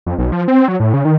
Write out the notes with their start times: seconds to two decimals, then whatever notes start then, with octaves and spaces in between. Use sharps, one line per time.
0.06 F2
0.18 B1
0.32 F3
0.48 C4
0.68 F#3
0.80 A2
0.94 C#3
1.05 D#3